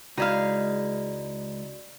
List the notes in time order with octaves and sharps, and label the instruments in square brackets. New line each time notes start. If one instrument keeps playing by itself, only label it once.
[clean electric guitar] C#2 [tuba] G#3 [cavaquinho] D#4 E4 F5 [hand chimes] F#4 D5 G#6